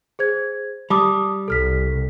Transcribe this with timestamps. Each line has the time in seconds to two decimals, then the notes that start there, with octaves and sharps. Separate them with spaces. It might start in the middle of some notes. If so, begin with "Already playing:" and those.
0.19 G#4 C5 G#6
0.90 G3 A5 D6 D#6
1.48 C2 A4 F6 B6